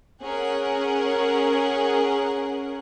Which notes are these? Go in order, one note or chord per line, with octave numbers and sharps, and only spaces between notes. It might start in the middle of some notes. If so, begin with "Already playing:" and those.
C#4 G#4 A#4 F#5